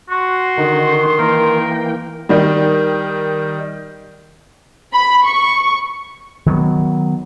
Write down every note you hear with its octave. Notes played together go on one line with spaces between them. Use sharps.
F#4 C6
D3 D#3 D#4
E3 A#3 A#4 G5
D#3 G3
B5
C#6
D#3 F#3 A3 B3